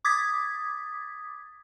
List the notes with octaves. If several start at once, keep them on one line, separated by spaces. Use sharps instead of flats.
D6 D#6 G#6 A6 B6